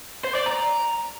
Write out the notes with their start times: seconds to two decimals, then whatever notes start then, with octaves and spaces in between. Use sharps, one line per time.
0.24 C5
0.35 D5
0.46 A#5